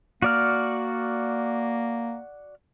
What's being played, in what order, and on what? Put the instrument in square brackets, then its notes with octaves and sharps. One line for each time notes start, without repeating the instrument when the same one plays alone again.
[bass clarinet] A#3 [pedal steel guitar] F#4 D5 F6